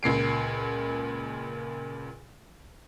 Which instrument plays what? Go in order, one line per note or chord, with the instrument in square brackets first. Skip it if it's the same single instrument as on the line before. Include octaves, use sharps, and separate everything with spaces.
[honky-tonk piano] C#2 A#2 C7 D7